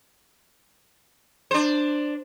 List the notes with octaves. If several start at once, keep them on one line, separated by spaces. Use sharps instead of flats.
D4 C5